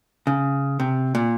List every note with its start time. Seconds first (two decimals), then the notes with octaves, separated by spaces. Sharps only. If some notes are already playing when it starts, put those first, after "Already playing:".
0.27 C#3
0.80 C3
1.15 A#2